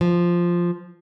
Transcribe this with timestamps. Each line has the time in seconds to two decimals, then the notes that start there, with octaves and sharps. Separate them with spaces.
0.01 F3